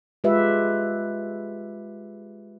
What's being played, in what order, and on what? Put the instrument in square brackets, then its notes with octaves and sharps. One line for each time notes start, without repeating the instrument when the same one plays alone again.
[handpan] G#3 F4 G4 B4 E5